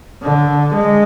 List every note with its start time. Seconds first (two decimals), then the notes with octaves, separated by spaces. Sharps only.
0.22 D3
0.74 G#3